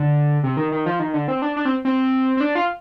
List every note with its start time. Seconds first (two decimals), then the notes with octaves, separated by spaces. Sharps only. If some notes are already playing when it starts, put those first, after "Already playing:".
Already playing: D3
0.43 C3
0.57 D#3
0.72 D#3
0.86 F3
1.00 D#3
1.14 D3
1.28 C4
1.42 D4
1.56 D4
1.65 C4
1.85 C4
2.37 C4
2.41 D4
2.55 F4